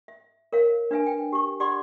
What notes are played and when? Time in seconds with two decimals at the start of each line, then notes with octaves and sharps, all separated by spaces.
0.08 E5
0.53 A#4 C#5 E5 F5
0.91 D4 B4 E5 G#5
1.06 G5
1.33 G4 C#6
1.60 G4 D5 F#5 C6 D6